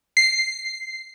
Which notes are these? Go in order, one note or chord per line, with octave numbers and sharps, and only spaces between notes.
C7